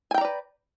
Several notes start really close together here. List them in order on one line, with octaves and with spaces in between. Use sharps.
G#5 G5 A#5 D5 B4